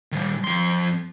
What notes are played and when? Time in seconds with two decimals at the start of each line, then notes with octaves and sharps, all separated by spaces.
0.12 D#3 G3
0.44 F2 C6